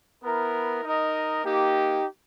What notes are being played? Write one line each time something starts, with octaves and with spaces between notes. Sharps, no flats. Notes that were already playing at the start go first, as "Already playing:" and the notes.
B3 E4 A#4
D#4 A#4 D#5
A#3 D#4 G4